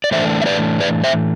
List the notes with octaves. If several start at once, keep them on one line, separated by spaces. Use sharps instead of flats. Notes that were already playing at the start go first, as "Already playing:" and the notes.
D5
A2 E3 A3 D4 C5 E5
E5
B4 D5
B4 D5
C5 E5